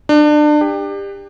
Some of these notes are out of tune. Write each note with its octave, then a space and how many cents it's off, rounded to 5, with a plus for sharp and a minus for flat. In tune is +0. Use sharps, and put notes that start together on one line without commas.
D4 +30
G4 +25